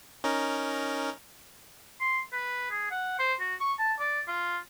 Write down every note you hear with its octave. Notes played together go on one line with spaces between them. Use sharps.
C#4 D#4 A#4
C6
B4
G#4
F#5
C5
F#4
C#6
A5
D5
F4